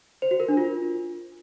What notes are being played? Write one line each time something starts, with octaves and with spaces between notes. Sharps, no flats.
C5
F#4
A#4
D4
F4